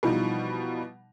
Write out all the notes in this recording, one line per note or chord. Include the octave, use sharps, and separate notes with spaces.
B2 E3 F3 G3 D#4